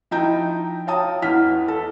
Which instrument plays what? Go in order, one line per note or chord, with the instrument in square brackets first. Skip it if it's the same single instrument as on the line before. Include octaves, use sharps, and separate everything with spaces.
[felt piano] F3 D#4 E4 G5 A#5 G6
C#5 F5 G5 A5 A#5 D#6
E2 E3 F#5 F6 B6
A4